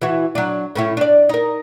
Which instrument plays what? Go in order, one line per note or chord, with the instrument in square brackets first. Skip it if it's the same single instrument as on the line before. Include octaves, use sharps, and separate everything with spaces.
[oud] E3 E4 F#4
F#3 D4
A2 C#4 E4
D4 D5
D#4 A#4